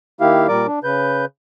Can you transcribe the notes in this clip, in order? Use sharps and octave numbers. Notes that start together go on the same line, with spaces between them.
D#3 A#3 E4 G4 F5
A#2 G3 A#4 D5 D6
D4
C#3 B4 G6